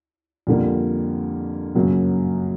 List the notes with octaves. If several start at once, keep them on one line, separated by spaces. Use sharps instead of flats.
F2 D3 G3 A#3
F#2 C#3 F#3 A#3